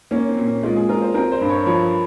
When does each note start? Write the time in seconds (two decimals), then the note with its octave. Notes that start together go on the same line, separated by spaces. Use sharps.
0.11 A#3 C#4
0.29 C4
0.37 A#2
0.46 C#4
0.63 G#3 F4
0.76 G#4
0.89 F4 A#4
1.02 C5
1.14 C4 A#4
1.32 C5
1.41 G2
1.49 C#5
1.66 F3 C#5